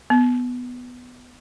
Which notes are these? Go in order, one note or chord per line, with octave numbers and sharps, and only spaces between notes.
B3